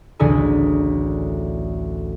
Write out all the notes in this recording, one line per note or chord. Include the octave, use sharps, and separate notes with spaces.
A1 D2 D3 G#4 A4 G#5